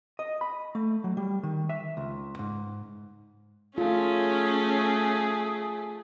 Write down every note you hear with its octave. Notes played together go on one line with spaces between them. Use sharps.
D#5
B5
A3
F#3
G3
D#3
E5
C#2
G#2
A3 C#4 F4 G#4